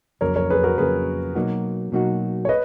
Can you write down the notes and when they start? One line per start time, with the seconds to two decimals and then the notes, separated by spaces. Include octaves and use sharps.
0.21 F2 C#3 F#3 A#3 A#4 C#5
0.36 A#4 C#5
0.50 G#4 B4
0.64 F#4 A#4
0.78 F2 C#3 F#3 A#3 G#4 B4
1.35 B2 F#3 A#3 D#4 F#4
1.92 B2 F#3 A#3 D#4 F#4
2.45 C#5
2.49 B4 D#5